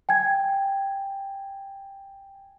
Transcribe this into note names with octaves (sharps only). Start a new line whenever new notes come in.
G5 G#5 G#6